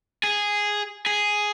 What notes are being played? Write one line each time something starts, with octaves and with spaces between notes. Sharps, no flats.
G#4
G#4